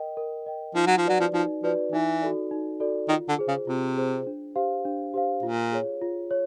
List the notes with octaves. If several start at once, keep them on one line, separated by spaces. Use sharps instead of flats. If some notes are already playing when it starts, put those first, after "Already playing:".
Already playing: A#4 D#5 G5
A#4
D#5 G5
F3 D#4
F#3
F3
F#3 F#4 B4 D5
F3
F3 D#4
F3 F#4 B4 D5
E3 D#4
F#4 A4 D5
D#4
F#4 A4 D5
D#3 F4
D3
G#4 C5
C#3
C3 F4
G#4 C5
D4
G4 C5 F5
D4
G4 C5 F5
A#2 F4
G#4 C#5
F4
C#5